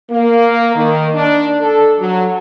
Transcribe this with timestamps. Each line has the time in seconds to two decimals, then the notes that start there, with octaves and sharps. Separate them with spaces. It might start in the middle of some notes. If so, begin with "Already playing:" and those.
0.11 A#3
0.75 D#3
1.15 D4
1.61 A4
1.99 F#3